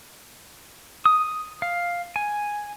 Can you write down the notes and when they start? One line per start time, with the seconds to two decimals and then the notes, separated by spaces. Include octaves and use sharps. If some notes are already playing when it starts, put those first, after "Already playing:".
1.05 D#6
1.62 F5
2.16 G#5